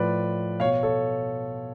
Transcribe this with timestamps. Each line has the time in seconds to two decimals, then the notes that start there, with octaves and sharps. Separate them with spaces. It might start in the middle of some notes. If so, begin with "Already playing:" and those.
Already playing: A2 F3 B4 D5
0.60 B2 C#5 F5
0.83 A4 C#5